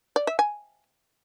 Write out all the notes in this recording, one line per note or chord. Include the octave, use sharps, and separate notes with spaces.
D5
E5
G#5